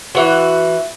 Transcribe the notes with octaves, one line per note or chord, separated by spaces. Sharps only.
E3 F#4